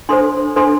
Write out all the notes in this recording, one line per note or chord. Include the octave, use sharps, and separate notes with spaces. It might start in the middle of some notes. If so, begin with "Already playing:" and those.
D4 A4 C5 C6
D4 A4 C5 C6